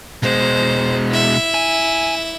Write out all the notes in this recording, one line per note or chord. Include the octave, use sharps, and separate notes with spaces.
B2 G#3 C5
E4 E5
G#5